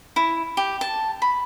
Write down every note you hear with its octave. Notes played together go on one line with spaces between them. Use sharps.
E4
G4
A5
B5